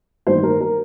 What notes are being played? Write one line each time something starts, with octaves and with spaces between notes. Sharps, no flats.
A1 G2 D#3 A#3 C5
A#4
A#4